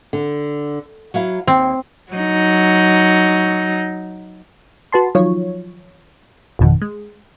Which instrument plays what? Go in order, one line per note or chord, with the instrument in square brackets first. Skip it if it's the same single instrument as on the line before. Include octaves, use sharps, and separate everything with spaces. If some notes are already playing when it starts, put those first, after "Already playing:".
[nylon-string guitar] D3
F#3 E4 F5
[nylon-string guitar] D#2 [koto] C4
[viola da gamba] F#3 D#4
[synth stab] F#4 B4 A5 C6
D#3 F3 F#3 F4 C#5
G#1 F2 B2 D#3
G#3